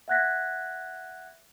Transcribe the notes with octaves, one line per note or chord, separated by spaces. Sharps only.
E5 F#5 F#6 G#6 A#6 B6